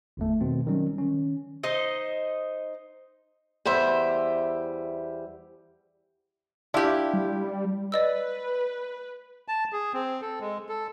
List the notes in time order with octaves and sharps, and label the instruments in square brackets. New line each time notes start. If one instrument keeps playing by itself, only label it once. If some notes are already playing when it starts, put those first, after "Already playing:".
[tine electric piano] G1 E2 A3
B2 D#3 C4
D#3 F#3 G3 C#4
D#3 C#4
[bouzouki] D#4 C5 D#5
[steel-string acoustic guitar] E2 G3 C5 E5
[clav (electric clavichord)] D4 F4 E5 [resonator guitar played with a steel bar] E4 G4
[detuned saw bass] G3
[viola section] B4 [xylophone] D5 D#5 E6
[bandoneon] A5
G#4
C4
A4
G#3
A4